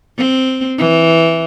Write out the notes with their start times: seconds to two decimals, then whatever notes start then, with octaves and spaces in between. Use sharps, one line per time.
0.17 C4
0.78 E3